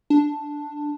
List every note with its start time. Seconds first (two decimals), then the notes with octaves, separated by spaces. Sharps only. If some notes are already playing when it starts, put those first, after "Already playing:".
0.10 D4